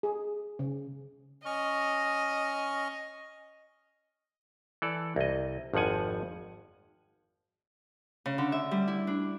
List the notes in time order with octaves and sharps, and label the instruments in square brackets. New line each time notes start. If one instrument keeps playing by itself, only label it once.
[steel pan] G#4
C#3
[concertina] C#4 C#6 F6 [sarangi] D#5
[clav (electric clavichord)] E3 A4 D5
C2 D#5
G#1 F2 F3 F#5 G#5
[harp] C#3
D3
E5
G3
E4
D4